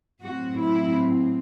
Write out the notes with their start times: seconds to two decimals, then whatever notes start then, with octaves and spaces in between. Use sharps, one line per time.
0.21 A2 F#3 C4 F#4
0.58 E4